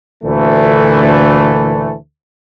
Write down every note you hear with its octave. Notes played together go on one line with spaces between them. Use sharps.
D2 A#2 E3 A3